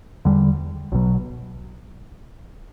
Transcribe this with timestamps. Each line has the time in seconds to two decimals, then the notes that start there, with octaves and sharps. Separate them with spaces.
0.25 E2 D3 G3
0.92 B1 B2 F#3